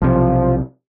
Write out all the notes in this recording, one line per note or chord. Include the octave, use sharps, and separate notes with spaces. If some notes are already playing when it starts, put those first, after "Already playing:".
B1 C3 F3